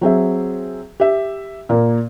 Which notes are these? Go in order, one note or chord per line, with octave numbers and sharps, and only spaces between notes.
F#3 C4 G#4 E5
G4 E5
A#2 A#3